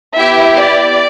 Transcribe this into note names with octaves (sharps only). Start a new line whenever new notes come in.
B3 E4 G4 E5
D5